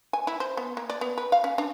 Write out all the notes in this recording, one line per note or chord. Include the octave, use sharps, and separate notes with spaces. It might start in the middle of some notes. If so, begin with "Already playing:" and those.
G#5
E4
C5
B3
A#3
D5
B3
B4
F5
C#4
D4